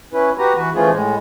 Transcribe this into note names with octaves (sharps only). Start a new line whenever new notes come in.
C#4 E4 B4
F#4 G4 B4 A#5
E3 F#4 B4
E3 F3 A3 C#4 F4 G#4
A2 G#3